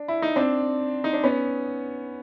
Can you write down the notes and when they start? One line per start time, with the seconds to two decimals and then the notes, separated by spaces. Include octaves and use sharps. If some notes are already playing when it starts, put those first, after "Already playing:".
Already playing: D4
0.08 E4
0.22 D#4
0.36 C4 D4
1.04 D#4
1.13 D4
1.23 B3 C#4